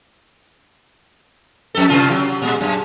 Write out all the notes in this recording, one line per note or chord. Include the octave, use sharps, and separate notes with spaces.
F2 A4
G2 C3 F4
F#3 G4
A#2 G#3
F#2